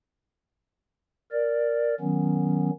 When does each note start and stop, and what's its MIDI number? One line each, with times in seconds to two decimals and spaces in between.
1.32 1.95 70
1.32 1.95 74
2.00 2.70 51
2.00 2.70 54
2.00 2.70 59
2.00 2.70 61